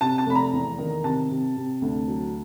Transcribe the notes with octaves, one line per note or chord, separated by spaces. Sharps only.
C3 A5
A5
F1 B5
A#5
E2
D#3
C3 A5
C3
C3
D2
F#3